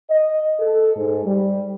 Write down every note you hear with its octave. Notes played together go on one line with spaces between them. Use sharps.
D#5
A4
G#2
G3